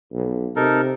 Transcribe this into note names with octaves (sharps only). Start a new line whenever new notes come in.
B1
C3 D#4 A4 A#4